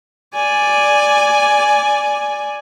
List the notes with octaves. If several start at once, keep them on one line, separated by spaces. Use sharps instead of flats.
D5 G#5